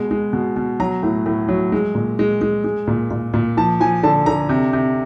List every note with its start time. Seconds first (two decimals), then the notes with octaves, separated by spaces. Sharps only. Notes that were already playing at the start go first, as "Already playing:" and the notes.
Already playing: B2 G#3
0.11 G#3
0.33 B2
0.56 B2
0.80 F#3 A#5
1.03 A2
1.26 A2
1.48 F#3
1.72 G#3
1.95 A#2
2.19 G#3
2.41 G#3
2.64 G#3
2.87 A#2
3.11 A#2
3.34 A#2
3.57 F3 A5
3.80 F3 G#5
4.03 D3 A5
4.26 D3 A#5
4.49 C3
4.73 C3